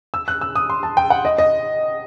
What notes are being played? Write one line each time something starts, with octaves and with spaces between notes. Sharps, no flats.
E6
F#6
E6
D#6
C6
A5
G5
F#5
D#5
D#5